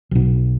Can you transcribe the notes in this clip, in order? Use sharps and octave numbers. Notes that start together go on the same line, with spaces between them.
B1 B2